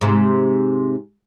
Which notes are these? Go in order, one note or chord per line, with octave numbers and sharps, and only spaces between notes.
G#2 C3